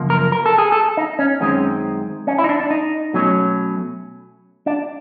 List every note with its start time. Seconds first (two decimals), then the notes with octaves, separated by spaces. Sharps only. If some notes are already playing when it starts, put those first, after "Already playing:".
Already playing: F#2 C#3 F3 A#3
0.10 A#4
0.32 A#4
0.46 A4
0.58 G#4
0.72 A4
0.97 D#4
1.19 C#4
1.40 F#2 D#3 G#3 C4 C#4
2.27 C#4
2.39 E4
2.44 D#4
2.49 D4
2.60 D4
2.70 D#4
3.13 B2 F#3 A3 C#4
4.66 D4